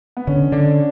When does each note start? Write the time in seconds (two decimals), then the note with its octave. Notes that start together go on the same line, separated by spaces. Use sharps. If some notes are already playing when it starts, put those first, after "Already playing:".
0.17 B3
0.27 D3 C#4
0.52 D3 D4